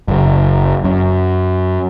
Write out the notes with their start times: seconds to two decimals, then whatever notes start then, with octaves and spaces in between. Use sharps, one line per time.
0.08 F#1
0.84 F#2